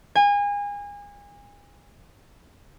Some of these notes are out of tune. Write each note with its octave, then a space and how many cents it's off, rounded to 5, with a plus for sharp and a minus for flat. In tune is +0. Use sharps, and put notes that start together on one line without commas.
G#5 -30